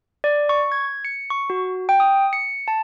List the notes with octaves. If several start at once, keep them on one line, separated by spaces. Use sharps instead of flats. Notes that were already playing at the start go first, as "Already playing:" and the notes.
D5
C#6
G#6
C#7
C#6
F#4
G5
D#6
C#7
A5